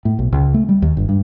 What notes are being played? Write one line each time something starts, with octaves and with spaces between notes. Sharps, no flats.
A2
B1
C#2
A3
G3
D#2
G1
G2